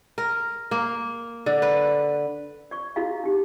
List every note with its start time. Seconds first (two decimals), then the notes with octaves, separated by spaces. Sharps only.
0.18 A#4
0.71 A#3
1.46 D3
1.62 B4
2.71 D5 C#6
2.96 E4 F#4 G#4 D#5 F5
3.24 D#4 G4 F#5